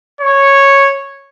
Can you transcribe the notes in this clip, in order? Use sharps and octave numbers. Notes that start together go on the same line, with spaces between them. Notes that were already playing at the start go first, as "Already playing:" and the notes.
C#5